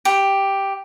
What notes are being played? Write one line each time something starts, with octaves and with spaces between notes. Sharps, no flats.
G4